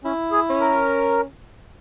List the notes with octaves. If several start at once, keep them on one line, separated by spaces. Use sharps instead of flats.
C#4 E4
G#4
C#4
A#4